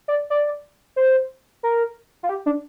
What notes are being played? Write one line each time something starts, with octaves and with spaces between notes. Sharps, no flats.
D5
D5
C5
A#4
F4
G4
D4